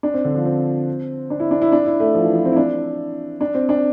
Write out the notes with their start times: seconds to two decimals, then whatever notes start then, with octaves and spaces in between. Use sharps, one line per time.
0.03 D4
0.14 C4
0.25 D3
0.35 F3
0.45 C4
1.30 D4
1.40 E4
1.51 D4
1.62 E4
1.72 D4
1.86 E4
2.00 A3
2.14 F3
2.25 E3
2.35 F3
2.45 C4
2.53 E4
2.56 D4
3.41 D4
3.55 C4
3.69 D4